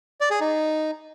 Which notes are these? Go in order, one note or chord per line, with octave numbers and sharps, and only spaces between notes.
D5
G#4
D#4